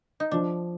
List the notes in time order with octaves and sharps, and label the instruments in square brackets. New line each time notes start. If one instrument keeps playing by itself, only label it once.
[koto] D#4
[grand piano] F3 [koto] D4